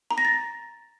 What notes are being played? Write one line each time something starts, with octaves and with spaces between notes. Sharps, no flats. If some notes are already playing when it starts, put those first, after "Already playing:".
A#5
A#6
A6